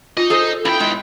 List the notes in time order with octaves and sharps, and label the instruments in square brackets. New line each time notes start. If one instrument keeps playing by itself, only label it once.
[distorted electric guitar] D#4 D#5 [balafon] F4
[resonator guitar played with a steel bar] G#4 A4 C5
[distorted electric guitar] B1 G5 [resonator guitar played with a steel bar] E4
[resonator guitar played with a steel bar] G#3 E4